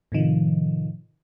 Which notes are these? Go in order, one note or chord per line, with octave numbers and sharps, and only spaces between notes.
A2 C3 D#3 F3